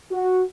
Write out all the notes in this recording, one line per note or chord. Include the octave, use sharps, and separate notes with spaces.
F#4